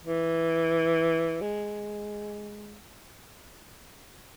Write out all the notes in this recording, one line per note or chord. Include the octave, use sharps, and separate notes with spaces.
E3
G#3